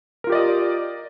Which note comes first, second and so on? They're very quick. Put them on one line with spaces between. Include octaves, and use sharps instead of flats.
A#4 F4 G4 D5 D#5